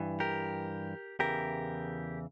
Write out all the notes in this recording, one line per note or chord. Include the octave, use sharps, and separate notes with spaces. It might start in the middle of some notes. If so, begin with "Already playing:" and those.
Already playing: G2 E3
G4 A#4
E2 C#3 E3 G4 A#4